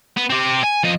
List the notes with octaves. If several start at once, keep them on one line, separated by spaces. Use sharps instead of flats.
B3
C4 G4
G#5
F3 D#5